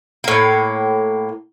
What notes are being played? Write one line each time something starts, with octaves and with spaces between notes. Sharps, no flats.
A2 A#3